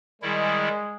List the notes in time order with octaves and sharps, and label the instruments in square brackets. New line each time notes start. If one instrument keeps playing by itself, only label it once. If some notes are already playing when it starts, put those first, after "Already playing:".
[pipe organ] D#3 G3 E4 [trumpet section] G#3